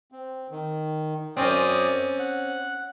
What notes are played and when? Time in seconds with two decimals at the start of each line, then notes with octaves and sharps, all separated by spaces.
0.12 C4
0.51 D#3
1.37 F#2 C4 C#4 D5 D#6
2.19 F#5 F#6